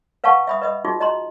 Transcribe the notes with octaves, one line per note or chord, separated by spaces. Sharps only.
B4 F5 F#5 A5 C#6
E5 B5 D#6
B4 D#5 B5 D#6
D#4 F4 F#4 G#4
D#5 A#5 C6